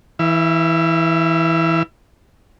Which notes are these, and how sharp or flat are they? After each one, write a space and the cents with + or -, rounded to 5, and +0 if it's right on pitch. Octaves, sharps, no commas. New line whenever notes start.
E3 -10 E5 +45